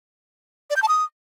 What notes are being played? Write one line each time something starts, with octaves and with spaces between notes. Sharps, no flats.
D5
G6
A5
D#6